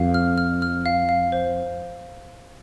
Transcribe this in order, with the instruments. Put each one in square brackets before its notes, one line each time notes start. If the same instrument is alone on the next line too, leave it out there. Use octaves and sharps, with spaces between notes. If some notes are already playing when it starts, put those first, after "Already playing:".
Already playing: [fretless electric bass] F2 [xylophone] F5
[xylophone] F6
F6
F6
F5
F5
C5